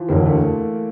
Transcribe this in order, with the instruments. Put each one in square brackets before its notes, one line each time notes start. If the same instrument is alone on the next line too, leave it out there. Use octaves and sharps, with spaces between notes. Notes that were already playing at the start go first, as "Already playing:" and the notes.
Already playing: [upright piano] E3 F3
[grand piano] E1 D2 D3 [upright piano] A#3
[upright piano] A3